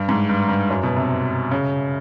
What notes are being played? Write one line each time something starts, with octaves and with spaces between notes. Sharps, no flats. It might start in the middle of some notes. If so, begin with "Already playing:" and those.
Already playing: G2
G#2
G2
G2
F#2
B2
C3
C#3